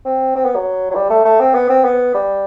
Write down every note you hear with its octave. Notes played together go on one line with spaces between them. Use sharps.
C4
C4
B3
F#3
F#3
G3
A3
A3
C4
B3
C4
B3
G3